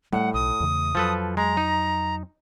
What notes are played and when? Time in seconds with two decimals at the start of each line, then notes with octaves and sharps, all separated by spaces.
0.13 A2 G3 A3 F#5
0.34 B1 D#6
0.60 E2 C#3 A3
0.95 F2 F3 F#3 A4 B4
1.37 G#3 A#5
1.57 D#4